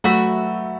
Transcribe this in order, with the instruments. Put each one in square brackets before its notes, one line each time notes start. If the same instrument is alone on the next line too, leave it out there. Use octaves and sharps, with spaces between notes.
[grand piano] F#3 A3 [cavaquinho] F#4 B4 E5